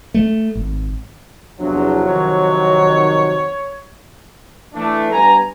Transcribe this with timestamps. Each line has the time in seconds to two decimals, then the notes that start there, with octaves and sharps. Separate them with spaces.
0.14 A3
0.55 G#1
1.60 E2 C3 F3 F#3 D4
2.06 D#3 C#5
4.74 E3 A3 D4
5.11 G2 B3 G#5 A#5